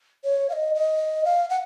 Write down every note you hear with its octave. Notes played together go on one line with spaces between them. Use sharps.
C#5
F5
D#5
D#5
F5
F#5